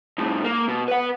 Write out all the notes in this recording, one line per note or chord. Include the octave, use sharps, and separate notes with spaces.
F2 A2
A#3
B2
B4 F#5